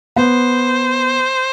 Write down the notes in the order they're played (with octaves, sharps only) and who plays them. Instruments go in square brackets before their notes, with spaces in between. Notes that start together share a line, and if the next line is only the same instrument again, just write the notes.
[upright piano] B3 [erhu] C5